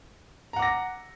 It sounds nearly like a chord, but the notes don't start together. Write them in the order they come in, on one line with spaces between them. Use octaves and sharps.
A#5 F#5 D6 A#6